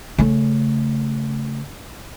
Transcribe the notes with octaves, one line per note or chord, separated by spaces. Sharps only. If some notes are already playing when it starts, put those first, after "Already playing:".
C#3 A3